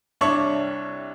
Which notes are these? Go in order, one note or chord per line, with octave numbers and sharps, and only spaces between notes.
C2 D4 C#5 E5 C#6